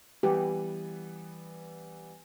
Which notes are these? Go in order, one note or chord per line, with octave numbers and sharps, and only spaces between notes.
E3 G3 B3 G4